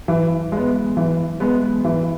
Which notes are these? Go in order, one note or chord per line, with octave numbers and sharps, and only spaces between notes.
E3
G#3 B3
E3
G#3 B3
E3